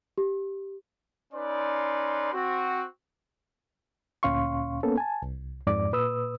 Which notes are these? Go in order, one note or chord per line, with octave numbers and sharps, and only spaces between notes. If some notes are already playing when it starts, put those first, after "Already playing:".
G4
C#4 D#4 B4 D5 C6
C4 F#4
D2 A#2 C#4 F5 C6 C#6
A#3 B3 C#4 A4
G#5 A5
C2
F2 G#2 D5 D6
A#2 B4 D#6 E6